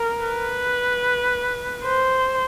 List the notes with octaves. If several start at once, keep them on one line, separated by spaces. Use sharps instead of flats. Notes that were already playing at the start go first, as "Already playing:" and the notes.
Already playing: A#4
B4
C5